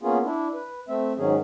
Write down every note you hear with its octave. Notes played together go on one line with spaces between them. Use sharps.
A#3 B3 C#4 F4 G#4
D4 E4
B4
A3 C4 E5
G#2 D#3 F#3 C#4 G#4